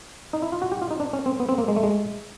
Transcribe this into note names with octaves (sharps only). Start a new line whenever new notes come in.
D#4
E4
F4
F#4
G4
F4
D#4
D4
C#4
C4
B3
C4
A#3
G#3
A3
G#3